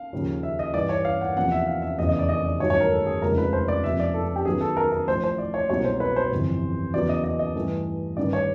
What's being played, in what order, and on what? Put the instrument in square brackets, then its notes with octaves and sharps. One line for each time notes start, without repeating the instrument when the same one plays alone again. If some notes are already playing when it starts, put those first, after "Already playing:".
Already playing: [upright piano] F5
D#2 C#3 F3
E5
D#5
G2 E3 G3 D5
C#5
F5
F#5
E2 C3 F3 A#3 F#5
E5
F5
E5
F1 E2 C#3 D#5
D#5
D5
D#5
D5
A1 G2 D#3 F#3 C#5
C#5
A#4
A4
G#4
F1 D#2 C#3 F3 G#3 A#4
B4
C5
D5
F#1 F2 C3 F3 E5
D5
A4
A4
G4
F#2 D#3 F#3 B3 G#4
A4
A#4
A#4
A1 A2 F3 C5
C5
D5
C#5
C2 B2 F#3 A#3 C#5
C5
B4
C5
G1 F2 C3 E3
E2 C#3 F#3 B3 D5
D#5
D#5
D#5
G2 E3 A3
A1 G2 D#3 D5
C#5